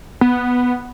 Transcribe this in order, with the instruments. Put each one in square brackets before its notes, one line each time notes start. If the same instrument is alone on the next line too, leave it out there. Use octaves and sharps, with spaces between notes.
[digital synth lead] B3